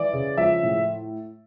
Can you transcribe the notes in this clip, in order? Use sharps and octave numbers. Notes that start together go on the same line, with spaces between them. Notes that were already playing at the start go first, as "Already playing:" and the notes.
Already playing: E3 D5
C#3
F3 E5
A2